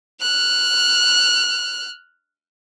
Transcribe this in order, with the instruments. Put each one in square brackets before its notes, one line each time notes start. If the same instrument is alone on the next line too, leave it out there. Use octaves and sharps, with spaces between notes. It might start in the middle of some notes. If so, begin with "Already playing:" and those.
[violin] F6 F#6